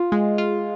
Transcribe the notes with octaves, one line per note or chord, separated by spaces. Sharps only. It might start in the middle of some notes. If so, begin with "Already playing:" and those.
Already playing: F4
G#3
F4